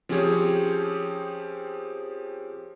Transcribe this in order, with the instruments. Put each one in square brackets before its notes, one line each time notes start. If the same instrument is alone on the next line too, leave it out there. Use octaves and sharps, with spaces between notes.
[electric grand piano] F3 C4 C#4 G4 G#4 C#5